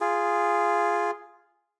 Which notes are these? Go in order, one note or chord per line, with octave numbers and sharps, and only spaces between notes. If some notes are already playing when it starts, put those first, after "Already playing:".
F4 G#4